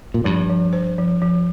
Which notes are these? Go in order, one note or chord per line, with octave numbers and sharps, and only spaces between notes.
A#2
G2 F3
F3
C5
F3
F3